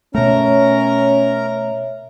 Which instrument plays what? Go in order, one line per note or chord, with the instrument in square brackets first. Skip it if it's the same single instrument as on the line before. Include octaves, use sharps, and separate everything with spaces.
[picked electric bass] B2 A3 [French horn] C#4 [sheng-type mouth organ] A#4 A#5 [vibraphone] C#5 E5